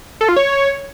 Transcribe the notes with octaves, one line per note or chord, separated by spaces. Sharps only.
A4
F4
C#5